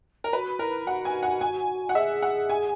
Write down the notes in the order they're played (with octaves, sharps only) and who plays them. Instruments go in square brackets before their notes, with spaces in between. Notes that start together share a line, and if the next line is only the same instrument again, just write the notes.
[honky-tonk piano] A#4
[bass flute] F#4 [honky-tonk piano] B4
[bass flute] E4 [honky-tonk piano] A#4
[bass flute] F#4 [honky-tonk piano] F#5
[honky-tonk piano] G#5
F#5
G#5
F#5
[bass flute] G#4 [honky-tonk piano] E5
[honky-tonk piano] F#5
G#5